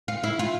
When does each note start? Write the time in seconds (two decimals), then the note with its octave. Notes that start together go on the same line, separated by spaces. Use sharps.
0.08 F4
0.23 E4
0.39 F4